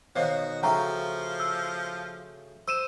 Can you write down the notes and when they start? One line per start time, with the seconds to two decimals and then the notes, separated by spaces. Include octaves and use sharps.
0.16 B2 D#3 F#4 C5 C#5 F5
0.63 C#3 F3 A3 F#4 G5 A#5 C#6
1.40 E6
2.68 C5 E6 D#7 E7